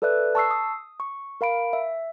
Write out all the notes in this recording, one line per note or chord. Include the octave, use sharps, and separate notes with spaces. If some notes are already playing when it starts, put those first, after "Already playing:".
A4 B4 D5 E5 F#6
A5 C#6 E6 C7
D#6
C#6
A#4 F5 B5 D7
E5